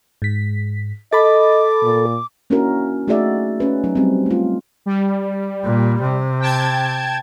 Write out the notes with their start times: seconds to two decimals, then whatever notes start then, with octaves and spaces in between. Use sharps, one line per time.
0.22 G#2 B6
1.13 A4 D#5 B5 D6 A6
1.83 A#2
2.50 A#3 C#4 D4 E4 F#4 A#4
3.08 A3 D#4 F#4 G#4 D5 E5
3.60 C#4 B4
3.84 F#3 D#4
3.95 G3 C4
4.26 A3 F4
4.86 G3
5.64 A#2
6.01 C3
6.40 G5 A5 G#6